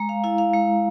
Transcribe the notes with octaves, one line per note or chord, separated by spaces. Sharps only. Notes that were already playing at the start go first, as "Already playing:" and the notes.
Already playing: G#3 A#5
F5
E4 F5
F5
G#3